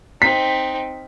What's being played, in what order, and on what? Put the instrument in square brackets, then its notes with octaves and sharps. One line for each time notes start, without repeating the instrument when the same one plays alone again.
[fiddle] C4 D#4 [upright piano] B6